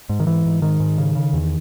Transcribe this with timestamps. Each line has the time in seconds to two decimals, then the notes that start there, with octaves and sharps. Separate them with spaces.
0.09 G#2
0.20 D#3
0.27 G#2 E3
0.46 G#2
0.62 G#2 D#3
0.80 G#2
0.98 C#3
1.15 C#3
1.33 E2